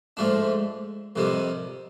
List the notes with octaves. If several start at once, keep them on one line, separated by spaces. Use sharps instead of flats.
G#2 F3 A3 D4
F2 C3 D#3 G3